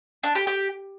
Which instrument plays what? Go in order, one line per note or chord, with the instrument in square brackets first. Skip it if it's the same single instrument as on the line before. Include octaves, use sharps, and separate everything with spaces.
[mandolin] D4
G4
G4